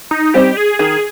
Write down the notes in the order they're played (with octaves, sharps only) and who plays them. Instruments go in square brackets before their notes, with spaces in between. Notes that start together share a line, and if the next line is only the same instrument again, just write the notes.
[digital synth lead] D#4
[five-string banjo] G3 C4 D#4 [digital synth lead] G4
[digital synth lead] G#4
[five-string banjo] D#3 [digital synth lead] G#4